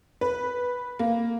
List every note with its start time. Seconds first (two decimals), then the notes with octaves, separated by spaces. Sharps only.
0.21 B4
0.99 A#3